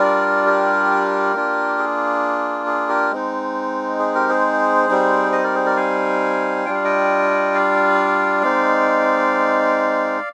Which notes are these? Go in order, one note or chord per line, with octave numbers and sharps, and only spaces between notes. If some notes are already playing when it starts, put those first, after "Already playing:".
Already playing: G3 D4 F4 A#4 D5
G4 A#4
A#3 D4 F4
G#4
G#4
G4 A#4
G#3 C4 D#4
G#4
G4 A#4
G#4 C5
G3 C4 D#4
C5 D#5
A#4 D5
G#4 C5
A#4 D5
F5 G#5
G3 D4 F4 G5
F5
D#5 G5
D5 F5
G#3 C4 D#4 D5 F5